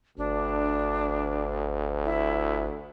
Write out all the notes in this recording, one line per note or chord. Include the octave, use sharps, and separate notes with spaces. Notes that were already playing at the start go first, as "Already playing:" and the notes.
G1 D2 D4
E4